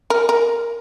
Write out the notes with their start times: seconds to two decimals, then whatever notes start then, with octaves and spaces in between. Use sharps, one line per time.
0.10 A#4
0.29 A#4